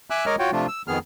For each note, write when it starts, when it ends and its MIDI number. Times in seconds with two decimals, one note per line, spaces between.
0.10 0.26 76
0.10 0.26 80
0.10 0.26 86
0.10 0.26 88
0.10 0.26 90
0.26 0.36 56
0.26 0.36 70
0.26 0.36 73
0.26 0.36 75
0.26 0.36 86
0.26 0.36 89
0.39 0.51 65
0.39 0.51 66
0.39 0.51 73
0.39 0.51 79
0.52 0.67 48
0.52 0.67 53
0.52 0.67 57
0.52 0.67 62
0.52 0.67 65
0.68 0.82 88
0.88 0.99 41
0.88 0.99 51
0.88 0.99 59
0.88 0.99 68
0.88 0.99 89